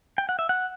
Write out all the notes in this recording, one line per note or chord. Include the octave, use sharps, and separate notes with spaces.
G5
F#5
E5
F#5